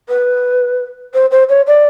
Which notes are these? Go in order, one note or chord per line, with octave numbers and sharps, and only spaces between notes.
B4
C5
C5
C#5
D5